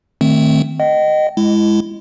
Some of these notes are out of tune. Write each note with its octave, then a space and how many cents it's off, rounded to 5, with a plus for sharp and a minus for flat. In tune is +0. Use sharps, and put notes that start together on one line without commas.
D#3 -20 A3 +0 C4 +0
D#5 -15 G5 -40
G#3 +0 E4 +15